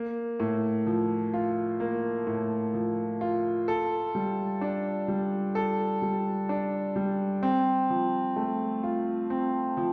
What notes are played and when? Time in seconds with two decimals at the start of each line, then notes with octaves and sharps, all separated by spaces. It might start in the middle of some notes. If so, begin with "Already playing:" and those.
Already playing: A#3
0.40 A2
0.87 F3
1.34 F4
1.80 A#3
2.27 A2
2.74 F3
3.21 F4
3.68 A4
4.15 G3
4.61 D4
5.08 G3
5.55 A4
6.02 G3
6.49 D4
6.96 G3
7.43 C4
7.90 F3
8.36 A3
8.83 F4
9.30 C4
9.77 F3